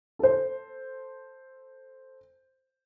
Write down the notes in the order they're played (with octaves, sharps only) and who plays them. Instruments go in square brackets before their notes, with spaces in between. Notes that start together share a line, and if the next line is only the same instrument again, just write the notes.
[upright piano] A4 C5